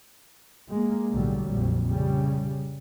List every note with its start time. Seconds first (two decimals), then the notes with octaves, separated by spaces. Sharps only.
0.70 G#3 A#3
1.12 B1 A2 D3 F#3 G3
1.48 A#1 F2
1.90 C#3 G3